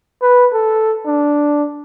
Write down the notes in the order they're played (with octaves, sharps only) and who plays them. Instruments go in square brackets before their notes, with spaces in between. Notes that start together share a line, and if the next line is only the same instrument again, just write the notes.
[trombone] B4
A4
D4